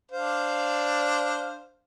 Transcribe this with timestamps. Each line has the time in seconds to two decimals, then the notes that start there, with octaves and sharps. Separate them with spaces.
0.11 D4 C5 F5